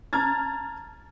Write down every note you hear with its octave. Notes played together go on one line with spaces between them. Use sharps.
A5 A#5 F6 G#6 A6